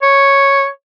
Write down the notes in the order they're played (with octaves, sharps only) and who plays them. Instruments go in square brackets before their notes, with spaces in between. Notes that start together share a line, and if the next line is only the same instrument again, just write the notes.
[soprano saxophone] C#5